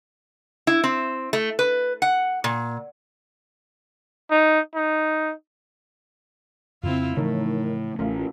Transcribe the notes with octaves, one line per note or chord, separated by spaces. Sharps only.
E4
C4
A3
B4
F#5
A#2
D#4
D#4
F2 C#3 C4 E4 F4
A2 C#3 E3 F3 A3 D#4 A#4 C#5
A1 A3 C#4 F4 A#4